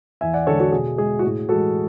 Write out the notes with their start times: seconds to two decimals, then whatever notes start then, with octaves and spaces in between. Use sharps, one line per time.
0.21 E2 E5 G#5
0.34 D5 F#5
0.47 D3 G#3 A4 C#5
0.60 F#4 A4
0.72 B2 G#4
0.98 G#3 G#4
1.19 F#4
1.23 A2 G#4
1.49 E3 G#3 F#4 A4